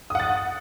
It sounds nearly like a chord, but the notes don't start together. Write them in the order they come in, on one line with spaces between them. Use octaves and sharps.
D#6 F#5 A6